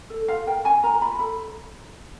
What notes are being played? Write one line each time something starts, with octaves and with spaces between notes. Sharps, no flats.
A4
F4 F5
A#4 G5
C#4 G#5
F4 A#4 A#5
F4 B5
A4 B5